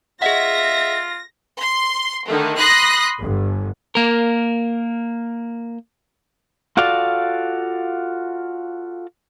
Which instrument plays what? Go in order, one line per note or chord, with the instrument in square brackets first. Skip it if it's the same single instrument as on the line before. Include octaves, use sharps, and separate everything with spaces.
[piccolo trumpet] F4 [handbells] G#4 D#5 F#5 [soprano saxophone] E5 [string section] A#6
[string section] C6
D3 D#3 A3
B5 C6 D#6 F#6 A#6
G1
[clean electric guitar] A#3 A#4
[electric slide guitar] F4 F#4 A4 D5 F5